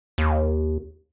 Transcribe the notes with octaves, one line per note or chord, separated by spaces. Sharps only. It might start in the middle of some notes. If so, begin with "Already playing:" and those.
D#2